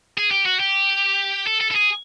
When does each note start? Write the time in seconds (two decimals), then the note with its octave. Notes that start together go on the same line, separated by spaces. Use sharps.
0.17 G#4
0.31 G4
0.46 F#4
0.60 G4
1.47 A4
1.61 A4
1.71 A4
1.76 G#4